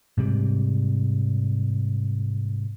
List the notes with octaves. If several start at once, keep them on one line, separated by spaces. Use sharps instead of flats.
G#2 C3 G3